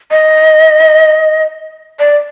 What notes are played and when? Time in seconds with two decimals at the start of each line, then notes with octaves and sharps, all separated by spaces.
0.11 D#5
1.99 D5